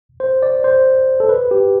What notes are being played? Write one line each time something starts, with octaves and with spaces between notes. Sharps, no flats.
C5
D5
C5
A4
B4
G4